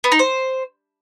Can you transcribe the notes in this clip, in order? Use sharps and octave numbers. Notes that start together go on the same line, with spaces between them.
B3
D#4
C5